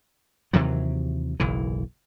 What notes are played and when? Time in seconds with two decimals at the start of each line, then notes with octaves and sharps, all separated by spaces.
0.53 D#2 C3 E3 F#3
1.40 F#1 B1 E3